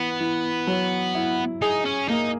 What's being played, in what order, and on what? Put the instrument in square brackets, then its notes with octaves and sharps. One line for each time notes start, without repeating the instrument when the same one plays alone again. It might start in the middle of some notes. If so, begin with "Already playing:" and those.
Already playing: [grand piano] E3 [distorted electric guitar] B3
[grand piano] E3
F#3
E4
[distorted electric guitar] D#4 [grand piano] G#4
[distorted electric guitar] C#4
[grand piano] A#3 [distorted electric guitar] D#4